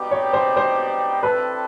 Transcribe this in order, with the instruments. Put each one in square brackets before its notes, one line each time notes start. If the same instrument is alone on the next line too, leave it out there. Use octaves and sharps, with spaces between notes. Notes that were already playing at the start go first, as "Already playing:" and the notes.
Already playing: [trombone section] B2 G3 B3 D#4 G4
[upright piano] C#5
C5
C5
[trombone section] G3 C4 E4 A4 [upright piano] B4